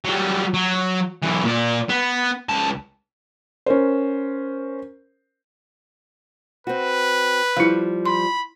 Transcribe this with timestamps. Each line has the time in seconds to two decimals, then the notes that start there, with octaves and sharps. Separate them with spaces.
0.05 F#3 G3
0.54 F#3
1.23 B1 E3
1.45 A#2 D5
1.89 B3
2.49 C#2 A5
3.66 C#4 A#4 C5
6.67 C4 F#4 B4
7.57 F3 G3 E4 F5
8.06 B5 C6